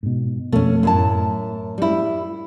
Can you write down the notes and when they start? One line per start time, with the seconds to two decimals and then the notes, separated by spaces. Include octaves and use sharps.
0.03 G#2 B2
0.52 F2 B2 A3 C#4
0.83 F#2 E4 A5
0.94 A2
1.78 G3 E4